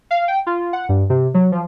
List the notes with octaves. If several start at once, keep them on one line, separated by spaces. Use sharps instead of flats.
F5
G5
F4
F#5
G2
C3
F#3
F3